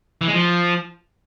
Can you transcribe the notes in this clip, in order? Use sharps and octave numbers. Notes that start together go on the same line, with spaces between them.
E3
G#3
F3